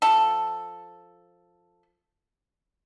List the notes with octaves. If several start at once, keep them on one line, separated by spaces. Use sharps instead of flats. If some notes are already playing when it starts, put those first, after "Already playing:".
F3 A4